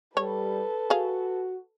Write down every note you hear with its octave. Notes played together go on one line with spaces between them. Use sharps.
G3 A4 B4 C#5
F#4 G#4 F5